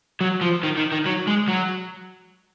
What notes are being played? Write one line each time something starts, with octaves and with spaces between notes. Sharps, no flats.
F#3
F3
D#3
D#3
D#3
F#3
G#3
F#3